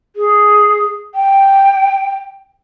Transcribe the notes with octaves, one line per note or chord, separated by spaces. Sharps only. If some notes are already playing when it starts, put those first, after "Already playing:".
G#4
G5